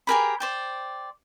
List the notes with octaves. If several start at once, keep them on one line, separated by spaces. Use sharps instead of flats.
G4 G#4 A#4 B5
C5 D5 G5